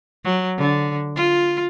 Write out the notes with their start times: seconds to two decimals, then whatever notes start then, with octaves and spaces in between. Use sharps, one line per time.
0.24 F#3
0.58 D3
1.16 F4